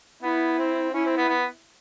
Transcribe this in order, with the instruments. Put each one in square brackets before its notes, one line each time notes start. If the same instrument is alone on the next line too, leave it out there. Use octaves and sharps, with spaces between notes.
[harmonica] B3 [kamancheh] E4
[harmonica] C4
[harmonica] C#4 [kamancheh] E4
[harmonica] C4
B3
B3